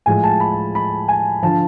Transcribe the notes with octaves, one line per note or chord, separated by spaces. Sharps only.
A2 F3 G#3 G#5
A5
B5
B5
G#5
D3 F3 A5